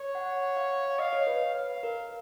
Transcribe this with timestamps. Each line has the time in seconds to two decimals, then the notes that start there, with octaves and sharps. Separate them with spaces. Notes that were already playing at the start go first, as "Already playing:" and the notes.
Already playing: C#5
0.15 F#5
0.43 F#5
0.57 F5
0.85 F5
0.99 D#5 F5
1.13 C#5
1.27 B4
1.55 F5
1.83 A#4